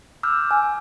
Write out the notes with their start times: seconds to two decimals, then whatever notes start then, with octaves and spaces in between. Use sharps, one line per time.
0.23 D6 E6 F6 G6
0.51 G#5